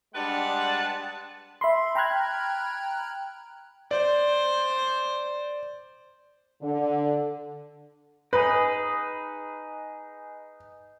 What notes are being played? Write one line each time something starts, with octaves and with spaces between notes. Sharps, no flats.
G3 G#3 D4 B4 F#5 A5
E5 B5 C6
G5 A#5 B5 F6 F#6 G#6
C5 D5
D3
D#4 G#4 B4